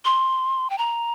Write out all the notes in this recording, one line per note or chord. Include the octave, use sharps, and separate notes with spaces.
C6
G5
A#5